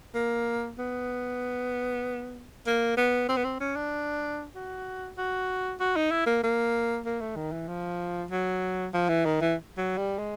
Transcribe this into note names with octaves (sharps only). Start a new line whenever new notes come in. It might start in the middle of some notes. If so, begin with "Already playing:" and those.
A#3
B3
A#3
B3
C4
B3
C4
C#4
D4
F#4
F#4
F#4
D#4
E4
A#3
A#3
A#3
A3
D#3
E3
F3
F#3
F3
E3
D#3
E3
F#3
G3
G#3